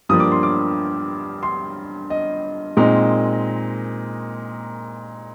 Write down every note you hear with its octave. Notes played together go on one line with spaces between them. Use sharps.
G2 F3 A#3 D4 D#6
D6
C6
D6
C6
D#5
A#2 G#3 C4 D#4